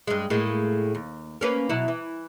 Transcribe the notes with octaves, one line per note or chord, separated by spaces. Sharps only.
G2 G#3
A2 G#3 A#3
D#2
A#3 C#4 B4
B2 F#3 E4
E3